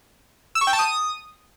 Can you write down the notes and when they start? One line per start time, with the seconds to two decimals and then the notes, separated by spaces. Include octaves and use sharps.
0.55 E6
0.61 C#6
0.67 G5
0.73 A5
0.79 D#6